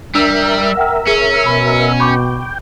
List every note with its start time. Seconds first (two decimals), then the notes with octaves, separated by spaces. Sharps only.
0.15 G3 D4 A#4 E5 E6
0.77 F#5 G5 F6
1.07 C#4 G#4
1.46 B2 B5
2.00 G5 B5 C#6 D6